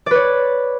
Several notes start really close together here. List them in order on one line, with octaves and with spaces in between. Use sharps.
D5 B4 C#5